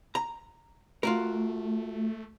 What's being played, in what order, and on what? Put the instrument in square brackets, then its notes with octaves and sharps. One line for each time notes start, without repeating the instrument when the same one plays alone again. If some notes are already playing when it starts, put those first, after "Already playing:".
[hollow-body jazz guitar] A#5
[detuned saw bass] A3 [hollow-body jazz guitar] F4 F#4 A#4